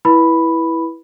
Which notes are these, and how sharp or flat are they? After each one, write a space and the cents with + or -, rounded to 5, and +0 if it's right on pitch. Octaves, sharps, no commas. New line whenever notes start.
E4 +0 B4 -20 B5 +0